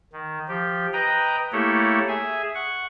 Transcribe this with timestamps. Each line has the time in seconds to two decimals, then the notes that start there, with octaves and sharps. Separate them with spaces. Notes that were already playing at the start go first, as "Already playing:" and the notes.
0.13 D#3
0.48 F3 G4
0.93 B4 D#5 G5 A#5
1.52 A3 A#3 E4 G4 A4 C#5
2.08 G#4 E5 G#5
2.54 F#5 C#6